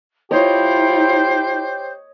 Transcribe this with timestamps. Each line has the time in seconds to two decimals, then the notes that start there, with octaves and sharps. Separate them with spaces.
0.31 E4 F4 G4 C5 C#5 D#5